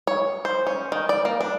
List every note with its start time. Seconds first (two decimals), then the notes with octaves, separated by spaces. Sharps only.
0.07 C#5
0.45 C5
0.67 C#4
0.92 D#3
1.09 D5
1.25 A#3
1.41 D4